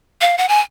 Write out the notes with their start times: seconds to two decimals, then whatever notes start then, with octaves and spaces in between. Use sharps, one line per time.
0.21 F5
0.38 F#5
0.49 G#5